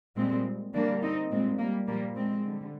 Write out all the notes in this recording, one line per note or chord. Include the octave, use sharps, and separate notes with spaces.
A#2 G3 G#3 C4
D3 G3 A#3 D4
C4 D#4
A#2 G3 G#3 C4
G3 A#3
A#2 F3 G3 A#3
G#3 C4
D3 G3